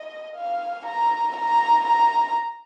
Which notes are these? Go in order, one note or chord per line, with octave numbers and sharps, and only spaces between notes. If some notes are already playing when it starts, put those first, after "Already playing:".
Already playing: D#5
F5
A#5
A#5
A#5